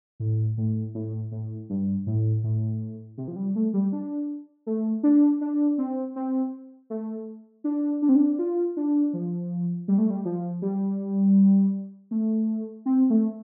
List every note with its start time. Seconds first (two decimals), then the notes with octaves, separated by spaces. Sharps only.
0.20 A2
0.57 A2
0.95 A2
1.31 A2
1.70 G2
2.06 A2
2.44 A2
3.18 C3
3.28 F3
3.36 G3
3.55 A3
3.74 G3
3.92 D4
4.66 A3
5.03 D4
5.41 D4
5.78 C4
6.16 C4
6.90 A3
7.64 D4
8.02 D4
8.09 C4
8.16 D4
8.39 F4
8.77 D4
9.13 F3
9.88 G3
9.98 A3
10.10 G3
10.25 F3
10.62 G3
12.11 A3
12.86 C4
13.10 A3